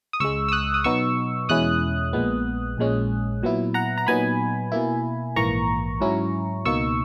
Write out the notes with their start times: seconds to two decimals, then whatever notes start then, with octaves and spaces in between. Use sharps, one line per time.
0.13 D#6
0.20 C#2 C#3 G#3 C#6 E6
0.49 E6
0.52 D#6 F#6
0.74 D#6
0.84 B2 F#3 B3 D#4 C#6 E6
1.49 E2 B2 G#3 C#4 E4 D#6 F#6
2.13 A#1 A#2 G#3 B3
2.78 A#1 A#2 G#3 C#4
3.43 A#2 F#3 B3 E4
3.74 F#5 A#5
3.98 A#5
4.07 A#2 F#3 B3 D#4 G#5 B5
4.72 B2 A#3 E4
5.36 A#1 G#2 E3 A#3 A#5 C#6
6.01 G#2 F#3 C#4 E4
6.65 C#2 B2 A#3 D#4 C#6 E6